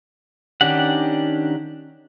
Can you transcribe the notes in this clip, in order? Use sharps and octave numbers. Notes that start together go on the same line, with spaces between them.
D#3 C#4 D4 G4 F#5